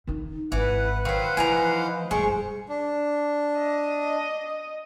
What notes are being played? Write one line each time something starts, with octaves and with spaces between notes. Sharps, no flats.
D#3 D#4
G#1 E3 B4 F#5
D#3 F#3 C5 F5 F#5
E3 F3 D#4 A#5
E1 G2 G#3 C5 C#6
D4
D#5